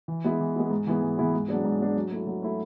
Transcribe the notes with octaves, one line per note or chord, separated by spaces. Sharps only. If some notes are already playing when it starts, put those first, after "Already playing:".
E3
G#3 B3 E4
E3
G#3 B3 E4
G#2
E3 B3 E4 G#4
G#2
E3 B3 E4 G#4
G#2
F#3 B3 D4 G#4
G#2
F#3 B3 D4 G#4
F#3
A3 E4
F#3
A3 E4